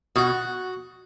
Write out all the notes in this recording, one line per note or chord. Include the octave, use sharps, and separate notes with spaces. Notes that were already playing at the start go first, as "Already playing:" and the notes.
B2 F#4